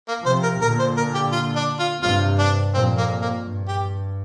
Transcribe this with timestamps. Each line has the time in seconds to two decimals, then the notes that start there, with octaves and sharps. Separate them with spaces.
0.08 A#3
0.26 C3 F3 C5
0.43 A#4
0.61 A#2 D3 A#4
0.79 C5
0.97 A#4
1.15 G4
1.32 F4
1.56 D4
1.79 F4
2.03 G2 C3 F4
2.39 D4
2.74 F2 A#2 C4
2.98 A#3
3.21 A#3
3.45 G2
3.68 G4